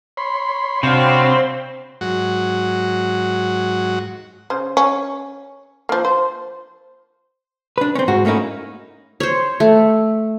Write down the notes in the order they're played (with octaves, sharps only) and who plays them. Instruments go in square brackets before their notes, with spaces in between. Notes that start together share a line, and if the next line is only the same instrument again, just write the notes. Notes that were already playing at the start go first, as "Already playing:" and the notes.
[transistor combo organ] C#5 B5 C6
[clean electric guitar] C3 D4 [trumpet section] G3 F#4 F5 [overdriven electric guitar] C4
[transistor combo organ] G#2 F#3 F#4
[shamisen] C#3 C5
C#4
F3 A#3
C5
[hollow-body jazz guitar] D4 B4
C4 C#4
G#2 F#4
A3 A#3 C#4 D#4 E4
[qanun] C5 C#5
A3